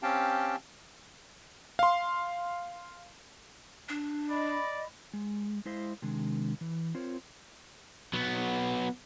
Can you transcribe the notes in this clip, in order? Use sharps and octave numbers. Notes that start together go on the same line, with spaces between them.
C4 C#4 G4 F5 G5 A5
F5 C6
D4
D5 D#5 B5
G#3
G#3 E4 C5 D#5 F5
C3 D#3 G#3 D4
E3
C4 F4 A#4 C5 C#5
F#3 B3